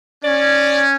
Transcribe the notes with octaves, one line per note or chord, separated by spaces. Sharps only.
C#4 D5